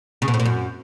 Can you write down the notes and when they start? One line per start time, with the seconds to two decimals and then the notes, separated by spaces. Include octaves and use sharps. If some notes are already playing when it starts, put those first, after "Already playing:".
0.22 C#3
0.28 B2
0.34 A2
0.40 A#2
0.45 F#2